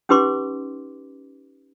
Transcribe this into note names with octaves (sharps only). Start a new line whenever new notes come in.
C#4 D#4 G4 B4 C6 D6